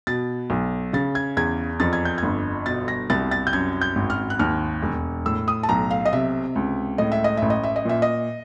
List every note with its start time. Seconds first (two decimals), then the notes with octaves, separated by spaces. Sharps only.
0.07 B2 A6
0.50 B1
0.93 C#3 A6
1.15 G#6
1.37 E2 G#6
1.80 F2 A6
1.93 G#6
2.05 G6
2.18 G1 G#6
2.66 B2 A6
2.88 A#6
3.10 C2 A6
3.31 A6
3.47 G6
3.53 F#2 G#6
3.81 G6
3.95 G#1
4.10 F6
4.30 F#6
4.39 D#2 F6
4.83 E1
5.26 A2 E6
5.48 D#6
5.63 A5
5.69 B1 A#5
5.91 F5
6.05 D#5
6.13 C3 E5
6.56 C#2
6.98 A2 D#5
7.12 E5
7.24 D#5
7.37 A1 E5
7.50 D#5
7.63 E5
7.76 D#5
7.85 A#2 E5
8.02 D#5